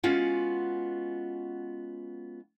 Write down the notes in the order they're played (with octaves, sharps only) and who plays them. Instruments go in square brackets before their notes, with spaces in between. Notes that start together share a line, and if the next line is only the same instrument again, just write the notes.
[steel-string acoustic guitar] G#3 B3 C#4 F4 F#4